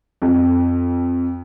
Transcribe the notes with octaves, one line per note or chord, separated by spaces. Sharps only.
F2